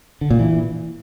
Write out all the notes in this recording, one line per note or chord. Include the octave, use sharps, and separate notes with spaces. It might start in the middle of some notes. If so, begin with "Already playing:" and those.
D3
A#2
E3